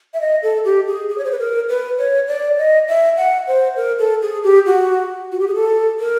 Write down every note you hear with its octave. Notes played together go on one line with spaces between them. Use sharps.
E5
D#5
A4
G4
G#4
G#4
C#5
C5
B4
A#4
B4
C#5
D5
D#5
E5
F#5
C5
A#4
A4
G#4
G4
F#4
F#4
G4
G#4
A4
A#4